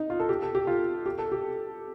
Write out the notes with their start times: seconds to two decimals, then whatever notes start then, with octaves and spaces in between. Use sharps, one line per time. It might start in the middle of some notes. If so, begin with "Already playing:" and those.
Already playing: D#4
0.10 F4
0.20 A4
0.29 G4
0.42 A4
0.55 G4
0.67 F4
1.06 G4
1.18 A4
1.32 G4